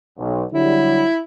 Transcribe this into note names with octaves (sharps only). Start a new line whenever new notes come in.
B1
D3 F#3 G3 E4